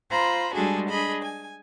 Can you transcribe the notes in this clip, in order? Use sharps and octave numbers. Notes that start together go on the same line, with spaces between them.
F4 C5 A#5 B5
G3 G#3 D4 F#4 G#4 A4
D4 G#4 D#5 B5
G#5